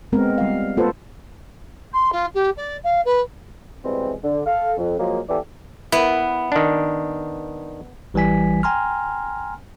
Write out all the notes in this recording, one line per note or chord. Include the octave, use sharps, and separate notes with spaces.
G#3 B3 C4 A#4
G3 F5
A#3 F4 A4 B4 C5 F#5
C6
F4
G4
D5
F5
B4
B2 E3 G3 G#3 C4
D3
A4 F5
F2
F3 F#3 G#3 A#3
E3 B3 G4 A4 D5
B3 E4
D#3 D4
A1 E3 G3 G#5 B6
G5 G#5 A#5 C6 F6